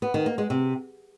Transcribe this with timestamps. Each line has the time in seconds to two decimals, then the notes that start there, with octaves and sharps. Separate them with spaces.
0.02 B3
0.14 D#3
0.26 A#3
0.38 G#3
0.50 C3